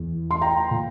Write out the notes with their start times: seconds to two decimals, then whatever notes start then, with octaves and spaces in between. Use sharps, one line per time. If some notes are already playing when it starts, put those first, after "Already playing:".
Already playing: E2 E3
0.31 C6
0.41 G5 A#5
0.71 A#2